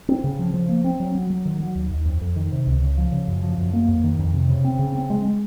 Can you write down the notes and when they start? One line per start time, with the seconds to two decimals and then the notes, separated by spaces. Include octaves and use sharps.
0.09 C4
0.24 C#3
0.39 F3
0.54 F3
0.69 A#3
0.84 C4
1.00 F#3
1.15 F#3
1.30 F#3
1.45 D#3
1.60 F#3
1.75 D#2
1.91 D#2
2.05 F2
2.21 F2
2.36 D#3
2.52 C3
2.67 C#2
2.82 C#3
2.97 F3
3.12 C#3
3.28 F#2
3.43 F3
3.58 F#2
3.73 A#3
3.88 F2
4.04 D#3
4.19 F2
4.34 C3
4.49 C#3
4.64 C4
4.79 C#3
4.95 C4
5.10 G#3
5.25 G#3